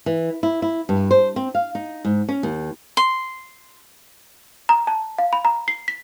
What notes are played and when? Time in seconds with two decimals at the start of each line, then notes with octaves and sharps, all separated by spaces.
0.06 E3
0.43 E4
0.62 E4
0.89 G2
1.11 C5
1.36 C4
1.55 F5
1.75 D#4
2.05 G#2
2.29 C#4
2.43 D#2
2.97 C6
4.69 A#5
4.87 A5
5.19 F5
5.33 B5
5.45 A#5
5.68 C7
5.88 B6